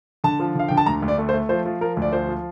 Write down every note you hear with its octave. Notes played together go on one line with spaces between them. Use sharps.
D3 A5
F3
D3 F5
D3 G5
A5
D2 A#5
D2
D5
A3
C5
A3
F3 C5
F3
F3 A#4
D2 D5
F3 C5
F3